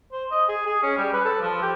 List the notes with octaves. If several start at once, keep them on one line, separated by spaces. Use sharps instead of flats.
C5
D#5
G#4
G#4
C#4
G3
B4
A4
F3
G4